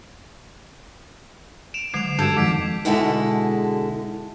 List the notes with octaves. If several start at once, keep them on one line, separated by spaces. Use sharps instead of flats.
D7 E7 F7
D3 F#3 G#3 C7 F7
G2 F#4 A4 G6 G#6 D7
F2 D#3 F3 G#3 D6 B6 D7
B2 D3 G#3 E4 G#4 A4